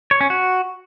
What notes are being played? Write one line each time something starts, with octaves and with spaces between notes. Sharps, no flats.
C#5
C#4
F#4